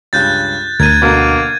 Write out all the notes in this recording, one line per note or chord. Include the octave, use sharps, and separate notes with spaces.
C#2 G2 F#6 G6 A6
D2 A#4 G#6 D#7
B2 D3 A#3 A#5